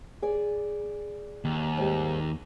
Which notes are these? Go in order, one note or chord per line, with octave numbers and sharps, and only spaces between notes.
G#4 D5
D#2
G#2 G3